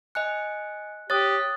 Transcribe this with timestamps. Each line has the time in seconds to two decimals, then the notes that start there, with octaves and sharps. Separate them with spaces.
0.15 D#5 G#5 F#6 C#7
1.10 G4 C#5 D#6 F#6 A6